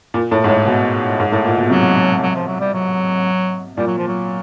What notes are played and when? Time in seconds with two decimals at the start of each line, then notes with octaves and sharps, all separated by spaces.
0.14 A#2
0.31 A2
0.44 G#2
0.49 A2
0.66 B2
1.20 G#2
1.32 A2
1.45 A#2
1.58 B2
1.70 C3 F#3
2.22 F#3
2.35 F3
2.48 F#3
2.60 G3
2.74 F#3
3.77 A#2 G3
3.87 F#3
3.98 F3
4.08 F#3